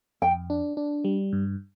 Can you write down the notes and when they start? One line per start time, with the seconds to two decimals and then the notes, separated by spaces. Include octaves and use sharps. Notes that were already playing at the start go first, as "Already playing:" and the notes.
0.22 F2 G5
0.50 D4
0.77 D4
1.04 G3
1.33 G2